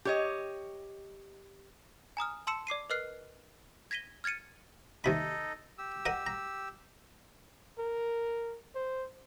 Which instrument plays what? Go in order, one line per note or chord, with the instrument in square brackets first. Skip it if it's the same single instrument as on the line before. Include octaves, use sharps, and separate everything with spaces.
[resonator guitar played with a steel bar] G4 C#5 D#5
[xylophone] G#5 A#5 D#6 F6
A5 C6 E6 C#7 E7
D5 D6 C7 D#7
A#4 B4 D#5 F6 F#6 C7
G#6 A#6 B6 D#7 G7
F6 G#6 A6 C#7 D#7
[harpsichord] D#2 C3 B5 [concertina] D#4 A4 D#5
[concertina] G4 E6
[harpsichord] A#4 D#5 F#5
A#5
[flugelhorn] A#4
C5